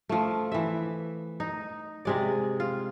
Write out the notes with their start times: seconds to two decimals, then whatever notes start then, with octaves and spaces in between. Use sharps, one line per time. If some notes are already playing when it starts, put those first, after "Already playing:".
0.09 F3 A3
0.52 E3 E5
1.40 D#4
2.05 C3 G#3 D5
2.60 F4